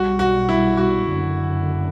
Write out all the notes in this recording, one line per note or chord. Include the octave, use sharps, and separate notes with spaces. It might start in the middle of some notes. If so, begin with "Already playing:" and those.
Already playing: B1 B2 G3 F#4
F#4
E4
F#4
F#1 F#2 D3